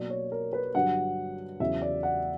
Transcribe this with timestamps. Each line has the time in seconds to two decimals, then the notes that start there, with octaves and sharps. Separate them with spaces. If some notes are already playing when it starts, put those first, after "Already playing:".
Already playing: B2 F#3 A#3 D5
0.10 C#5
0.32 A#4
0.53 B4
0.75 G2 D3 F#3 F#5
1.60 E2 C#3 F#3 E5
1.82 D5
2.03 F#5